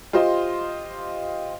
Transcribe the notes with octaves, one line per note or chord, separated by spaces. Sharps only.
F4 G4 C5 D#5 C6